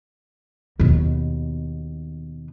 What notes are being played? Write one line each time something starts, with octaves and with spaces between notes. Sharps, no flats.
D#2 B2